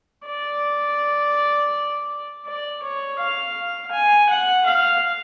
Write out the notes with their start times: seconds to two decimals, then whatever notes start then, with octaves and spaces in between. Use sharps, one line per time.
0.26 D5
2.45 D5
2.82 C#5
3.19 F5
3.92 G#5
4.29 F#5
4.66 F5